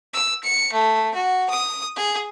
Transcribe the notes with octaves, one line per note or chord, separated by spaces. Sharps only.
E6
C#7
A3
F#4
D#6
G#4